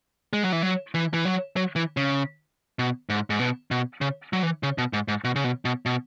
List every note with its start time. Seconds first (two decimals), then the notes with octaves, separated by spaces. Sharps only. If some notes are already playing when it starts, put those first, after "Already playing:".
0.33 G#3
0.43 F#3
0.53 E3
0.63 F#3
0.94 E3
1.14 E3
1.25 F#3
1.56 F#3
1.76 E3
1.97 C#3
2.79 B2
3.09 G#2
3.30 G#2
3.39 B2
3.71 B2
4.01 C#3
4.33 F#3
4.43 E3
4.63 C#3
4.78 B2
4.93 G#2
5.08 G#2
5.24 B2
5.36 C#3
5.44 B2
5.65 B2
5.86 B2